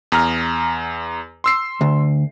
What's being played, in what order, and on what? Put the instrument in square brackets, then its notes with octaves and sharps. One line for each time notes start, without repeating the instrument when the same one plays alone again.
[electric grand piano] E2 A#5 F6
C6 E6 C7
[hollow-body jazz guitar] D2